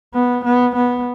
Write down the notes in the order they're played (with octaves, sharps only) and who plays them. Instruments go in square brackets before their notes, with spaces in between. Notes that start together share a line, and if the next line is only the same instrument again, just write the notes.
[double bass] B3
B3
B3